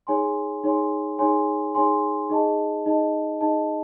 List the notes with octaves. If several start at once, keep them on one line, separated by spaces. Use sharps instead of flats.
D#4 G#4 C#5 G#5 C6
D#4 G#4 C#5 G#5 C6
D#4 G#4 C#5 G#5 C6
D#4 G#4 C#5 G#5 C6
D#4 G#4 D#5 A5
D#4 G#4 D#5 A5
D#4 G#4 D#5 A5